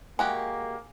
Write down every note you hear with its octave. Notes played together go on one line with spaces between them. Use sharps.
G#3 A#3 F#4 G4 G#5